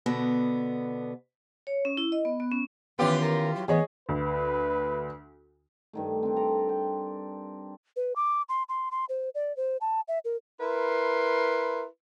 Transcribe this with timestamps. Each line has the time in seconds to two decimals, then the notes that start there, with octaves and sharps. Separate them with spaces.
0.06 B2 D3 B3
1.67 C#5
1.85 C#4
1.97 E4
2.12 D#5
2.25 B3
2.40 B3
2.51 C#4
2.99 D#3 E3 B3 C#4 F4 G4 B4
3.21 A#4
3.55 F#3
3.68 E3 B3 G#4 C#5 D#5
4.09 D2 B4
5.93 G2 D#3 A3
6.23 C4 D4
6.36 A4 D5 A#5
6.69 G5
7.96 B4
8.16 D6
8.49 C6
8.69 C6
8.91 C6
9.09 C5
9.35 D5
9.57 C5
9.81 A5
10.08 E5
10.25 A#4
10.60 E4 A#4 B4 C6